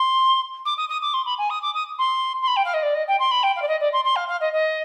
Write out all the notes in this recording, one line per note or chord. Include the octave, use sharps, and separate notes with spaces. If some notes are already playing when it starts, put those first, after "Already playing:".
Already playing: C6
D6
D#6
D#6
D6
C6
B5
G#5
D#6
D6
D#6
C6
C6
B5
G5
F5
D#5
D5
D#5
G5
C6
B5
G5
F5
D5
D#5
D5
C6
C6
F5
F5
D#5
D#5